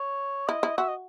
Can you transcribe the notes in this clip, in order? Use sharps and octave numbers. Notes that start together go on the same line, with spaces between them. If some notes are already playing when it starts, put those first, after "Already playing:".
Already playing: C#5
E4 D#5
E4
F#4 E5
D#5